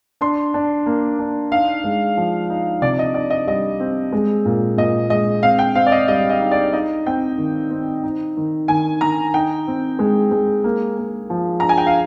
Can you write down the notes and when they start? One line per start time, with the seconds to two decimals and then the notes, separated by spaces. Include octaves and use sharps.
0.21 D4 C6
0.54 D4
0.86 A#3
1.19 D4
1.52 D#4 F5
1.84 G#3
2.17 F3
2.50 D#4
2.82 C3 D5
2.99 D#5
3.14 D#4 D5
3.30 D#5
3.47 G3 D#5
3.80 C4
4.12 G#3
4.45 A#2
4.77 A#2 D#5
5.10 G#3 D#5
5.43 C4 F5
5.59 G5
5.75 C4 F5
5.87 D5
5.92 D#5
6.08 G3 D#5
6.30 D#5
6.41 D#4
6.51 D5
6.73 D#4 D#5
7.06 C4 G5
7.38 D#3
7.71 C4
8.04 D#4
8.37 D#3
8.68 D#3 G#5
9.01 D#3 A#5
9.34 D#4 G5
9.67 C4
9.99 G#3
10.31 G#3
10.64 A#3
10.97 A#3
11.30 F3
11.60 D4 A#5
11.69 G#5
11.78 G5
11.87 F5